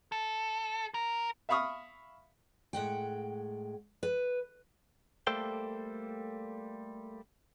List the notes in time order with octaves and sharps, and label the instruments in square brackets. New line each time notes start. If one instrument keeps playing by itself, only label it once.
[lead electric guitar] A4
A#4
[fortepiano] E5 F5 B5 C#6 D#6 F6
[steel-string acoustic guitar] A2 G#3 F#5 G5
B4
[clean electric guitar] G3 A3 A#3 A4 C5 G5